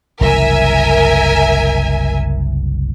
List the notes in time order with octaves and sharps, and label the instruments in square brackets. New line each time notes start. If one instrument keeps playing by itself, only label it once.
[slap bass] F#1 C2 E3 [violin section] A#4 E5 G#5